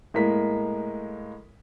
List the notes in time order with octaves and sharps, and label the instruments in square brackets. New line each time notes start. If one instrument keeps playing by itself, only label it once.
[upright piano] A2 G#3 A#3 A#4 B6